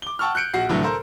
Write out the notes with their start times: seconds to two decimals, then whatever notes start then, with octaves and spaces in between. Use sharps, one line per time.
0.02 D6 G7
0.19 F#5 G5 A5 C#6 E6 F6
0.35 F#6 G6 C#7 D7
0.53 A#1 F#4 F#5 C7
0.69 C2 A2 D3 E3 F#3 A3
0.83 A4 A#4 C5